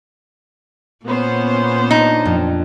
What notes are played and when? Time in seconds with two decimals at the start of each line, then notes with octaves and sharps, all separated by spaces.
1.06 A#2 B3 C#4 C5
1.91 D4 D#4
2.25 F2